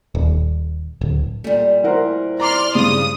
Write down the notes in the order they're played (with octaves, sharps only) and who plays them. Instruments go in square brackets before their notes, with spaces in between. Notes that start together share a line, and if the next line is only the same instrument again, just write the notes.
[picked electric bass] D#1
D1
[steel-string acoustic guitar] A#2 G3 [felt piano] A3
[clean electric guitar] E4 C5 [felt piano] A#4 F#5
[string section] D5 C6 F6 [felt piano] A#5 D6
[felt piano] G2 C#3 G#3 [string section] D#6